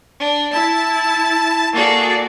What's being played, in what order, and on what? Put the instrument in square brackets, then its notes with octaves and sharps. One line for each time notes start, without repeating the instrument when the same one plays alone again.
[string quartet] D4
[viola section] E4 [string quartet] A5
[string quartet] A#3 G#4 A4 [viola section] F#4 D5